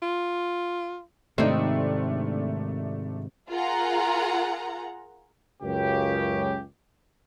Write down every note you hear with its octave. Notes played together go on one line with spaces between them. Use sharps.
F4
G#2 C3 D#3 A3 C4 D4 D#4
F4 G#4 A#4 F#5 A#5
C#2 F#2 C#3 G4